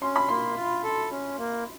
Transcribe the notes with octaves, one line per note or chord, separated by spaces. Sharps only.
C#4 C6
B5
A#3 C6
F4
A4
C#4
A#3